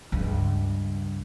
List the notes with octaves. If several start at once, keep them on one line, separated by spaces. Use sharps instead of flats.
C#2 G2